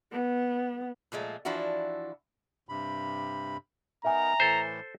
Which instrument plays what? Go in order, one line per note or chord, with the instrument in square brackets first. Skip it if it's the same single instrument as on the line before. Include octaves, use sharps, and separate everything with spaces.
[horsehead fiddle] B3
[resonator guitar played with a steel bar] A#2 F3 G#3 A3
E3 F3 D4 E4 F#4
[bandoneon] G2 C3 B5
[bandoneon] B3 D#4 A#4 [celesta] E5 G#5 [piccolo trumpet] A#5
[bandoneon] A2 E3 [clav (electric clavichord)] A4 C5